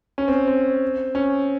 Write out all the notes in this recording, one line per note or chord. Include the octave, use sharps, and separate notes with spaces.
C#4
C4
C4
C#4